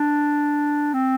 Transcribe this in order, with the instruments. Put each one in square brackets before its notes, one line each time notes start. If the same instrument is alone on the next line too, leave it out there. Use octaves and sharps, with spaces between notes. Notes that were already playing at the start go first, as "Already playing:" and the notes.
Already playing: [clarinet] D4
C4